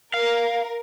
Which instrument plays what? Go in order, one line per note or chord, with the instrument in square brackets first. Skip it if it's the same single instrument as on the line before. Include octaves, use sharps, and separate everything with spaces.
[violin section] A#4 [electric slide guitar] F5